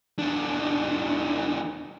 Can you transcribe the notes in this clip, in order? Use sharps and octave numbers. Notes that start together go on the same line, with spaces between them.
E2 D4